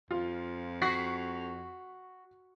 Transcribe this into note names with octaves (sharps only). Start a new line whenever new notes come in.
F2 F4
F#4 C#6 B6 C7